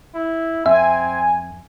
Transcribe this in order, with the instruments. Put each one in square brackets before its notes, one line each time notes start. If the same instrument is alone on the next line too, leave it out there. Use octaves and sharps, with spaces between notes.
[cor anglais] E4
[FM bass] F2 [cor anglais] C4 [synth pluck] E5 [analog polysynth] G#5